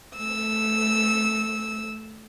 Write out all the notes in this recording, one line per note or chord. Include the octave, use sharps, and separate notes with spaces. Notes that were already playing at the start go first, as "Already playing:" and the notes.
A3 E6